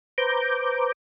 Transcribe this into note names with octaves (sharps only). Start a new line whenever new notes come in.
B4 C5 A#5 D6 G6